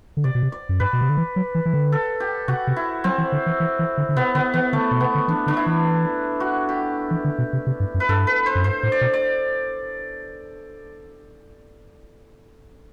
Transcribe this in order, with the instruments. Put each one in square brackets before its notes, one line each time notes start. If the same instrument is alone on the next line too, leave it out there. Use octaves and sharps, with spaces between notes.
[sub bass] D3
[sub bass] C3 [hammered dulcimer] D5
[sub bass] B2
C3
[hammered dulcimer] D5
[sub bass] F#2
[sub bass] G2 [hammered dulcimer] B4
[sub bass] B2
C3
D3
E3
F#3
E3
E3
D3
[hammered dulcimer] A4
G4
[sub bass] C3 [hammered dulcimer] F#4
[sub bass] C3
[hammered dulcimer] E4
[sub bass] F#3 [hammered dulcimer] C4
[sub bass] E3
D3
E3
E3
E3
D3
D3
[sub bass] C3 [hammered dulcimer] B3
[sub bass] D3 [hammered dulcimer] B3
[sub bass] E3 [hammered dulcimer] B3
[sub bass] D3 [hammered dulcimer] A3
[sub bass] B2
[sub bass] C3 [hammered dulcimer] B3
[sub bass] D3
[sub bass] E3 [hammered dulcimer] D4
[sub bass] D3 [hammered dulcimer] D4
[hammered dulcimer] E4
[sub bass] E3
[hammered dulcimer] F#4
G4
[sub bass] E3
D3
B2
C3
C3
G2
F#2
[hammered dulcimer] B4
[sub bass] G2 [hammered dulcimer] A4
[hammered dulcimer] B4
C5
[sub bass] F#2
[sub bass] G2 [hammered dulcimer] C5
[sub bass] A2
[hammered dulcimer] D5
[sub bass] B2
[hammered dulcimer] D5